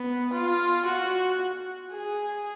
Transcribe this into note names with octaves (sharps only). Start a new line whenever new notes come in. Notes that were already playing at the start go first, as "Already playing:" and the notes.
Already playing: B3
F4
F#4
G#4